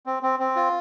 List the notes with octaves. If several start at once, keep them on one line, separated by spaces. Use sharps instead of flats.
C4
C4
C4
F4